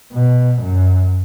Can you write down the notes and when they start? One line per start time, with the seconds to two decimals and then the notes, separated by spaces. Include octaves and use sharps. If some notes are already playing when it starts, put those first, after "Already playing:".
0.13 B2
0.62 F#2